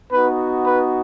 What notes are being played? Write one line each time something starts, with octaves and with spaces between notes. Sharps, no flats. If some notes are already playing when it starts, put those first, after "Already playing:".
B3 D#4 F#4 B4
B4